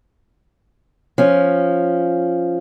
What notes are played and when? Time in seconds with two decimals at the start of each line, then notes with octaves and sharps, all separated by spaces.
1.18 F3 C#4